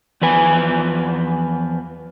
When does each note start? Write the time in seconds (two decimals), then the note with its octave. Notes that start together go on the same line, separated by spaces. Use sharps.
0.22 E2 F3 B4 G#5